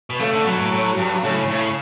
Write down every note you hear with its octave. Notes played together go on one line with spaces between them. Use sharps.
B2
C#3 A3
D3
B2 F#3
A2
A2
G2
A2 C#3
A2 C#3